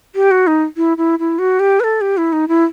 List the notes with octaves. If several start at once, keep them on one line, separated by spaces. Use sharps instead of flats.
G4
F#4
D#4
E4
E4
E4
F#4
G4
B4
A4
G4
E4
D#4
E4